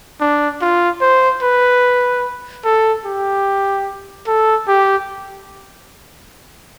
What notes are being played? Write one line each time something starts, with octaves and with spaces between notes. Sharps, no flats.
D4
F4
C5
B4
A4
G4
A4
G4